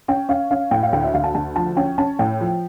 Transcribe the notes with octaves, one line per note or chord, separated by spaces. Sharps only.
C#4 G5
C#4 F5
C#4 F5
A2 G5
F5
D2 G5
E5
D2 F5
A5
D2 A5
F3 A5
C#4 G5
C#4 A5
A2 G5
F3